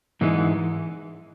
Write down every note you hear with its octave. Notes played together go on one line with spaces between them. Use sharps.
G#2 E3 G#3 D#4